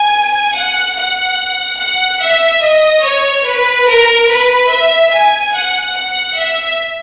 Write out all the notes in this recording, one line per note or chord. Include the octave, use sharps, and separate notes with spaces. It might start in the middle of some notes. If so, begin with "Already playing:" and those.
Already playing: G#5
F#5
F#5
F#5
E5
D#5
C#5
B4
A#4
B4
E5
G#5
F#5
F#5
E5